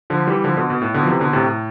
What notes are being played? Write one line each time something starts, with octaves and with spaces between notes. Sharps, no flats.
D3 F3
E3 G3
D3 F3
B2 D3
B2
A2
B2 D3
F3
C3 E3
B2 D3
A2 C3
A2